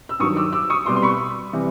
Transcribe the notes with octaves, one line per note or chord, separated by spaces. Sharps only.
E6
G2 D#3 F#3 C#6 D#6
D6 E6
D6 E6
C#6 D#6
C2 B2 G3 C6 D6
C6
B5 C#6
C3 E3 G3